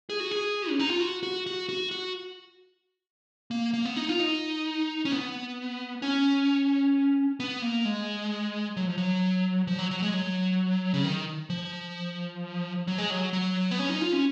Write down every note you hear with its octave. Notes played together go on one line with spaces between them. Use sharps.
G#4
F#4
G#4
C#4
D#4
F4
F#4
F#4
F#4
F#4
F#4
A#3
A#3
B3
D#4
F4
D#4
C#4
B3
C#4
B3
A#3
G#3
F#3
F3
F#3
F3
F#3
F#3
G#3
F#3
C#3
D#3
F3
F#3
G#3
F#3
F#3
B3
C#4
D#4
F4
C#4